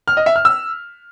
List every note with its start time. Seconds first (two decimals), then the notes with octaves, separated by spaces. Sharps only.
0.08 F6
0.17 D#5
0.26 E5
0.36 F6
0.45 E6